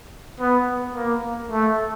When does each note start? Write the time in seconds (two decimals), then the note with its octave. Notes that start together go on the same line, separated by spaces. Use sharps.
0.40 B3
0.95 A#3
1.51 A3